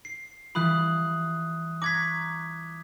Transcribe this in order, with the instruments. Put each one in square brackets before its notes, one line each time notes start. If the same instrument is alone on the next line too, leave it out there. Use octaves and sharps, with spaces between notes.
[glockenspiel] C7
[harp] E3 G3 F4 [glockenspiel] B5 D#6 F#6
[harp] A#5 C#6 F#6 [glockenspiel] D6 G#6 B6